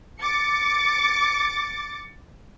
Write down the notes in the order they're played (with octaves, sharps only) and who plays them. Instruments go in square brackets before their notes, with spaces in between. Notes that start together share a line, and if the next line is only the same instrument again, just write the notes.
[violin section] D6 A6 C#7